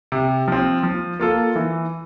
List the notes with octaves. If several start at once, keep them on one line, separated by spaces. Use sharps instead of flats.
C3
F3 C4
F3
A#3 F4 A4
E3